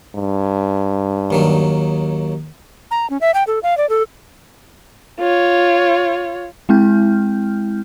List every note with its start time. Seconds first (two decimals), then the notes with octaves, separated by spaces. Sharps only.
0.15 G2
1.31 D#2 D#3 F#3
2.91 A#5
3.10 C#4
3.21 E5
3.34 G5
3.47 A4
3.63 F5
3.77 D5
3.89 A4
5.20 F4 C#5
6.69 G#3 C4 E4 G5 F6 G6